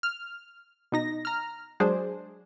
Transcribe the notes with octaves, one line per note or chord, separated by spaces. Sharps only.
F6
B2 D#4 A#6
A#5 F6
F#3 G#3 D4 G#4 C5